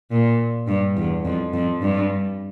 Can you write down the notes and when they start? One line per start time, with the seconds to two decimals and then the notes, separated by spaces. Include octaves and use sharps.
0.11 A#2
0.68 G2
0.96 E2
1.25 F2
1.53 F2
1.81 G2